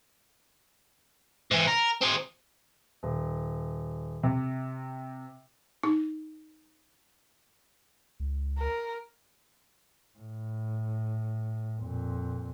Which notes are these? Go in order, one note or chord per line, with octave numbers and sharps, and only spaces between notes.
G#2 E3
A#4
C4 G#4
D#1
C3
D#4
C#2
A#4
A2
F2 A#2